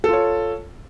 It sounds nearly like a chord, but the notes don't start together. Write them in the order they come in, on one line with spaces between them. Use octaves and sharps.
A4 F4 C#5